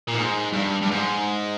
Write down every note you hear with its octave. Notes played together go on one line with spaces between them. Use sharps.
A#2
G#2
G2
G2
G#2